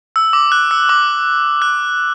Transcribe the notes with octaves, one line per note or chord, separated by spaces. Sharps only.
E6
D6
F#6
E6
D6
F#6